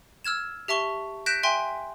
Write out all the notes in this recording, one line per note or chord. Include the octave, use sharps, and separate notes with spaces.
E6 F6 G#6 E7
G4 E5 A5 C#6 G7
F#6 G6 A#6 B6 D7 E7
E5 G5 G#5 C6